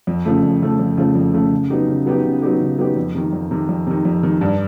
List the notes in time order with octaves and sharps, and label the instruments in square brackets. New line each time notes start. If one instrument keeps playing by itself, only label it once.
[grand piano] F2
C#3 F3 A3
F2
C#3 F3 A3
F2
C#3 F3 A3
F2
C#3 F3 A3
C#3
F#3 B3 D#4 G4
C#3
F#3 B3 D#4 G4
C#3
F#3 B3 D#4 G4
C#3
F#3 B3 D#4 G4
F2
C3 D#3
F2
C3 D#3
F2
C3 D#3
F2
C3 D#3
G2